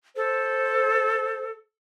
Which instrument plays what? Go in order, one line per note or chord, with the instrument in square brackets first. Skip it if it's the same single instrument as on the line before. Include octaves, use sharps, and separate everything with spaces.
[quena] A4 [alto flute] C5